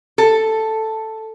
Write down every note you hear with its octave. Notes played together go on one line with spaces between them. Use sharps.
A4